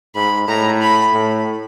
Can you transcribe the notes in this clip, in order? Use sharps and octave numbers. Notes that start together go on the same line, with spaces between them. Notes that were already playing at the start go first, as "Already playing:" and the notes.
G#2 B5
A2 A#5
B5
A2